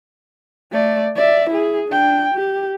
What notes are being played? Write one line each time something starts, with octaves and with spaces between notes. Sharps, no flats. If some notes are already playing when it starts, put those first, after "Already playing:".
A3 D5
D5 E5
E4 G#4
D4 G5
G4